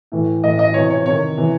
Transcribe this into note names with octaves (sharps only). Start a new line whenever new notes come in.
A2 E3
A2 E3 D#5
D#5
C3 E3 C#5
C#5
C3 D#3 C#5
C3 E3